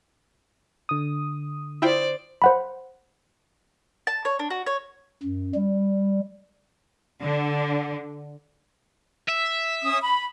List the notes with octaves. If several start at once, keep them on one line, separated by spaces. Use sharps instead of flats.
D3 D#6
E4 F4 C5 D5 G5
C5 F#5 B5
A5
C#5
D4
F#4
C#5
F#2
G3
D3
E5
C#4 D#6
B5